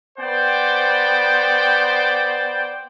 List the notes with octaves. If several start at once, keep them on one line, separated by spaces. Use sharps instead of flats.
B3 C5 D5 G5